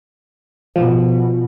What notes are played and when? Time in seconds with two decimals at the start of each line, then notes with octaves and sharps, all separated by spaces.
0.76 B2 F3